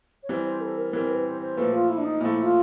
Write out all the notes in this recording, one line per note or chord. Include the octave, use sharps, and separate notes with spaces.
C#5
E3 G3 C4 C5
C5
A4
A#4
E3 G3 C4 A#4
B4
C5
C5
A#2 F3 A3 B4
F4
E4
D4
D#4
A#2 F3 A3 E4
F4